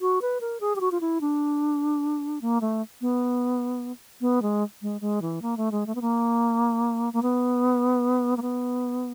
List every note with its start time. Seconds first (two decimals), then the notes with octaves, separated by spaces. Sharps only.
0.01 F#4
0.22 B4
0.41 A#4
0.60 G#4
0.76 G4
0.80 F#4
0.91 F4
1.01 E4
1.21 D4
2.41 A#3
2.61 A3
3.01 B3
4.21 B3
4.42 G#3
4.82 G#3
5.01 G#3
5.22 E3
5.42 A#3
5.57 A3
5.71 G#3
5.86 A3
5.95 B3
6.01 A#3
7.13 A#3
7.22 B3
8.37 A#3
8.42 B3